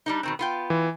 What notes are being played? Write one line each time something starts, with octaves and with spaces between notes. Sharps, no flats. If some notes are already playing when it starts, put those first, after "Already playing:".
G3 D4 D#4
B2 D#3 C4
B3 F4 G5
E3